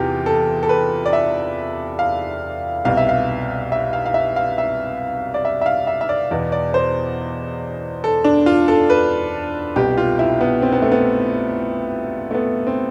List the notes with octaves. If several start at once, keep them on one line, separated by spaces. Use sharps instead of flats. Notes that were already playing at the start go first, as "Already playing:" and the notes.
Already playing: E2 C3 E3 F4 G4
A4
A4
B4
D5
E5
F5
C2 B2 F5
E5
F5
E5
F5
F5
E5
F5
E5
D5
E5
E5
F5
E5
E5
D5
E2 B2 D5
D5
C5
A4
D4
F4
A4
B4
C2 B2 G4
F4
E4
B3
C4
B3
A3
B3
A3
B3
C4